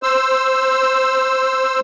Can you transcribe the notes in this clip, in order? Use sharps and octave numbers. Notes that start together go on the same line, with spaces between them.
C5 E6